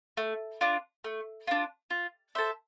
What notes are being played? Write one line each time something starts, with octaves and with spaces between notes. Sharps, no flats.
A3
D4 F4
A3
D4 F4
F4
A4 C5 E5